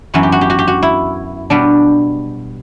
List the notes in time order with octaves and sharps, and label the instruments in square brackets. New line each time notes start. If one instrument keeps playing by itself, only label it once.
[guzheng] F#2 E3 B3 F#4
G4
F#4
G4
F#4
G4
F#4
E4
B2 G3 B3 D4